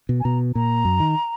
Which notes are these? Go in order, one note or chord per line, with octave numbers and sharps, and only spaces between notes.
B2
G#5
B2 A#5
A#2 A#5
F#2
D#3